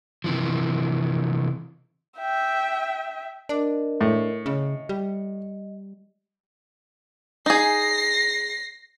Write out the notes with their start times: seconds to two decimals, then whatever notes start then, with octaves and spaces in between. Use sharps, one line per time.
0.24 C3 E3 F3
2.19 E5 G5
3.49 D4 A#4 D#5
4.01 A2
4.46 C#3 D#5
4.89 G3
7.46 D#4 G#4 A#6 C7